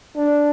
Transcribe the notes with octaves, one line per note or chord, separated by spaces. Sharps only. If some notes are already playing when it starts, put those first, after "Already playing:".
D4